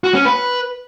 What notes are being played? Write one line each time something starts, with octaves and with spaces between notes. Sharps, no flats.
F#4
C#4
B4